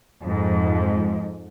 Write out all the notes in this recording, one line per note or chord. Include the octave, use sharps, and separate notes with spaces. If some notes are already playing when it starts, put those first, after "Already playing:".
F2 G#2